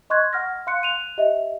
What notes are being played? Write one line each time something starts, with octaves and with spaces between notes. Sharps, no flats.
D#5 C6 C#6 F#6 G#6
F#5 F6 A#6
F5 C6 F#6 C#7
F#6 D#7 F7
G4 D#5 E5